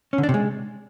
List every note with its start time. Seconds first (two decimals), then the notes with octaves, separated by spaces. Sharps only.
0.13 C#4
0.18 D3
0.23 D4
0.29 C3
0.34 G#3